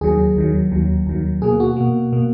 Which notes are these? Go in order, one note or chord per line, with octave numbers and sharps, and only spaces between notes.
D#2 D#3 F#3 G#4
D#2 D#3 F#3
D#2 D#3 F#3
D#2 D#3 F#3
B2 A#3 G#4
F#4
B2 A#3
B2 A#3